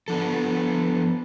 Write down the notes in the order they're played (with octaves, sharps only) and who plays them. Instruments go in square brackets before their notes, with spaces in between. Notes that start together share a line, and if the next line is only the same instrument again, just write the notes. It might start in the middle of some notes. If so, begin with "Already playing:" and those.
[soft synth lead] F3 [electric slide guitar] B3 D4 A4